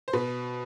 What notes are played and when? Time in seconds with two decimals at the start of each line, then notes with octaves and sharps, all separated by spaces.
0.08 C5
0.13 B2 B4